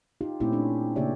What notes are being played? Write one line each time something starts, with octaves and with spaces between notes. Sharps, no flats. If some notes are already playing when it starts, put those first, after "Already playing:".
D#4 F4 G4
A#2 A3 C4 C#4 E4 G4
C#4 D4 A4
C#3 A#3 G4 C#5 D5 E5